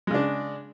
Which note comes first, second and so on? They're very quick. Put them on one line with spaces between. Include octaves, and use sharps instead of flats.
G#3 C#3 D4